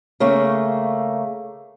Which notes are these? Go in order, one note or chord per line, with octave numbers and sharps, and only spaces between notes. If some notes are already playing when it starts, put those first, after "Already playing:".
C#3 A3 A#3